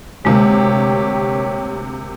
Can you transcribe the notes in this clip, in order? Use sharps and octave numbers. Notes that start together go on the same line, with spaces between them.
D2 C3 G#3 A#3 G4 C#5